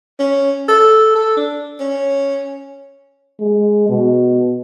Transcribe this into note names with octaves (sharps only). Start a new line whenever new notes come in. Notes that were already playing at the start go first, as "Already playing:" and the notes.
C#4
A4
A4
D4
C#4
G#3
B2